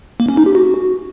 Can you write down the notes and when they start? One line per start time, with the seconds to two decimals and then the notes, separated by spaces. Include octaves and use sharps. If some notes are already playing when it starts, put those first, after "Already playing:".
0.20 A#3
0.29 C#4
0.37 D#4
0.46 G4
0.55 F#4